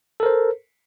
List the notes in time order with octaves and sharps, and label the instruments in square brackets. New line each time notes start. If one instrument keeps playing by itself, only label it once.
[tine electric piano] A4
A#4
C5